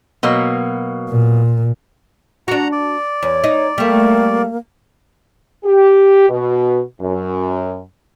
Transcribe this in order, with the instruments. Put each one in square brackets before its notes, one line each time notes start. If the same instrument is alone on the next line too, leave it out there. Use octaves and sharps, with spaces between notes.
[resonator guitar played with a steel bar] B2 F#3 A#3
[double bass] A#2
[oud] D4 F#4 [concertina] F#5 A#5
[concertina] D5
[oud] E2 [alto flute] C#5
[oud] D#4
[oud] G3 A3 [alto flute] A#3
[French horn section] G4
B2
F#2